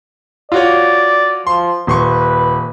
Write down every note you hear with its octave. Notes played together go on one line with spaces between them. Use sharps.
F4 F#4 C#5 D5
F3 C6
D#1 B4 C6 C#6